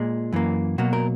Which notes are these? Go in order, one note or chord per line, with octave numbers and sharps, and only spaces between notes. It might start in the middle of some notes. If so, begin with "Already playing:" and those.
Already playing: A#2 G#3
F#2 E3 A#3
B2 F#3 A#3 F#4
A#4